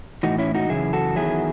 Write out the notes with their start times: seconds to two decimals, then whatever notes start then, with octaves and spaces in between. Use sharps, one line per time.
0.23 A2 E3 D#4 F#4
0.38 C#4 E4
0.55 D#4 F#4
0.69 F#2 C#3 E3 E4 G#4
0.93 F#4 A4
1.16 E2 D#3 F#3 E4 G#4